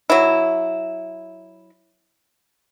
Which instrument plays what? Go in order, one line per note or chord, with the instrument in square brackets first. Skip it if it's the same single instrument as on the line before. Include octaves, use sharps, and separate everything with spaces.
[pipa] F#3 E4